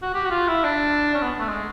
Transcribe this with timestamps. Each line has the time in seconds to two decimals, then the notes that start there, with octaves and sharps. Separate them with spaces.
0.02 F#4
0.14 G4
0.25 F#4
0.31 F4
0.48 E4
0.64 D4
1.15 C#4
1.23 B3
1.40 A3
1.48 G#3